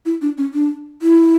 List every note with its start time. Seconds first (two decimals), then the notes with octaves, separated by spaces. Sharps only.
0.06 E4
0.22 D4
0.38 C#4
0.54 D4
1.02 E4